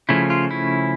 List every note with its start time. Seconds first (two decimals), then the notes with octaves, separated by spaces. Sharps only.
0.09 C#3 F3 A3 C#4 E4
0.30 F4
0.51 E4